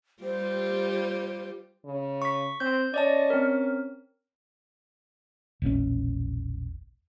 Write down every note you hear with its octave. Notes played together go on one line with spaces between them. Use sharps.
G3 F4 G4 C5
C#3
C#6 B6
C4 G6
C#4 D5 D#5 A5
C4 A#4
E1 A#1 C3 C#4